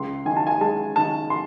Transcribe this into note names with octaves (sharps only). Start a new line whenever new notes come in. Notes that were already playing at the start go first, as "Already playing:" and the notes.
Already playing: C#2 C6
D#3 G#5
A5
G#5
G#3 A5
D#3 A5
C6